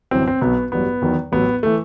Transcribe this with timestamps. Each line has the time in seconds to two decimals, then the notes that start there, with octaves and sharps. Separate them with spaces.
0.11 G1 F#2 E3 C4
0.27 C4
0.41 B1 B2 F#3 B3
0.72 A1 G2 F#3 B3
1.02 E2 D#3 F#3
1.32 A1 A2 F#3 B3
1.63 E3 A3